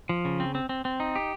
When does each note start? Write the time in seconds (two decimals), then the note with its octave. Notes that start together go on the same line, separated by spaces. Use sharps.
0.09 F3
0.25 C#3
0.40 C4
0.55 C4
0.69 C4
0.85 C4
1.00 D#4
1.15 G4